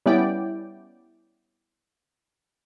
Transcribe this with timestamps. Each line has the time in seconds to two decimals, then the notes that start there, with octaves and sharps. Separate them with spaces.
0.06 G3 B3 C#4 E4 D5 G5